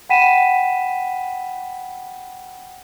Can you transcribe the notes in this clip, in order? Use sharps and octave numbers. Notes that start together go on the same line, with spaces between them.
F#5 G5 B5 B6 D#7 E7